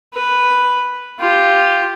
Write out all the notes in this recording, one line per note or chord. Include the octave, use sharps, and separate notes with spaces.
B4
F4 G4